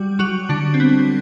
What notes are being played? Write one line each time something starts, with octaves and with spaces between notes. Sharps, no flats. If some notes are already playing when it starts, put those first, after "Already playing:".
Already playing: G3 F#4
F#3 F#4
D3 D4
C4
B3